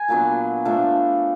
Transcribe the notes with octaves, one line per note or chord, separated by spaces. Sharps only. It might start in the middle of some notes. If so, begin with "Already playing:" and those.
Already playing: G#5
A#2 F#3 B3 D4
F3 A3 D4